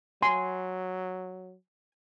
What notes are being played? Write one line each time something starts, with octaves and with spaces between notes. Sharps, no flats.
F#3 G#5 C6